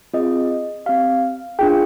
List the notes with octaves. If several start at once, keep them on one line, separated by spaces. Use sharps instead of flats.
C4 F4 G#4 D#5
C4 G4 F5
D4 F4 G#4 G5